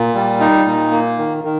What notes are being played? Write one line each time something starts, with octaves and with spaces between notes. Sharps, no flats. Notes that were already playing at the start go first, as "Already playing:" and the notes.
Already playing: A#2
G3
D#4
A#2
A#3
D#3
D#3